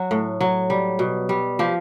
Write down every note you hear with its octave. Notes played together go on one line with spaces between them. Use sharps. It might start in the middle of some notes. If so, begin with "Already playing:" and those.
Already playing: F#3 F#4
A2
F#3
G3
B2
G3
F3 G4